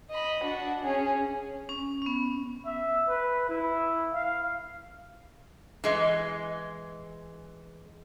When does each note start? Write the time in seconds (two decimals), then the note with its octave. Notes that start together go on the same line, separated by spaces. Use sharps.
0.10 D#5 B5
0.44 D4 F#4
0.84 C#4 G#4
1.69 C#4
2.02 B3 C#4
2.65 E5
3.09 B4
3.49 E4
4.13 F5
5.84 E3 G#3